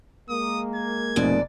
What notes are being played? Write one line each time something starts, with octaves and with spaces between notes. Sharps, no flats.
G#3 A#3 D#6
G#6
F1 G#2 B2 D5